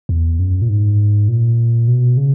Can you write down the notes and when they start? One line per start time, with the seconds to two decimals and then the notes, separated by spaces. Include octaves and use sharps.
0.09 E2
0.39 F#2
0.62 A#2
0.69 G#2
1.28 A#2
1.88 B2
2.17 C#3